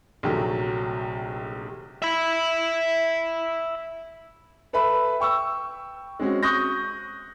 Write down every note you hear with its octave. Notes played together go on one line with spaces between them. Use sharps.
A#1 C3 D#3 F#3 A3
E5 B5
A4 B4 E5 B5
G5 C#6 E6
G#3 C4 C#4 F#4
C#6 D#6 F#6 G6 A#6